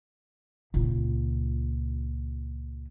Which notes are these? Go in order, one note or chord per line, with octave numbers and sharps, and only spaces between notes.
C#2 A#2